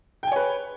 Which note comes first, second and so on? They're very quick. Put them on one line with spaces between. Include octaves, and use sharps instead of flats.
G5 G#5 C#5 B4